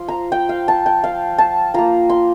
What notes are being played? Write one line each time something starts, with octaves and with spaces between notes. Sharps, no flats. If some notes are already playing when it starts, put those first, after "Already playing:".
Already playing: F3 F4 C6
A#5
G5
F5
A5
G5
F5
A5
A#3 F4 A#5
C6